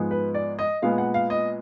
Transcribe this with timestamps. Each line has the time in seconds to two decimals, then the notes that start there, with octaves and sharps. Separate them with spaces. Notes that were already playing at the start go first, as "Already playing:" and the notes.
Already playing: G#2 F3 G#3 B3
0.11 B4
0.34 D5
0.59 D#5
0.82 A#2 G#3 B3 F5
0.98 F#5
1.14 F5
1.30 D#5